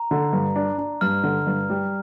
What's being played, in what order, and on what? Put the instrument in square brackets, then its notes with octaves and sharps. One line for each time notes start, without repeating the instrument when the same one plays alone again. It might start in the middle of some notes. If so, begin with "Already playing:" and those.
Already playing: [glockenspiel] A#5
[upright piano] D3
G2
D4
D4
[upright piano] G2 [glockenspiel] F6
[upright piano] D3
G2
G3